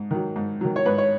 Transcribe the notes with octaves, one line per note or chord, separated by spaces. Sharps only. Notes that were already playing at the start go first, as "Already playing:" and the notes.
Already playing: G#2
D#3 F#3
G#2
D#3 F#3
C#5
G#2 B4
C#5